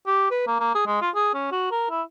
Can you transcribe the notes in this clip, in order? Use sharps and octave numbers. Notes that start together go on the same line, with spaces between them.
G4
B4
A#3
A#3
G#4
G#3
F4
G#4
C#4
F#4
A#4
E4